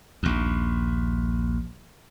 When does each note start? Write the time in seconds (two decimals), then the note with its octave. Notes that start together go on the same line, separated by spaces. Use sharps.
0.23 A#1 D#2